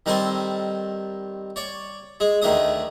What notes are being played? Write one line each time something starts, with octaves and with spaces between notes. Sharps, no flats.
D#3 G3 C4 A4 G#5 C6
C#5 D5
G#3 G#4
D2 D#3 A3 D4 G#4 D#6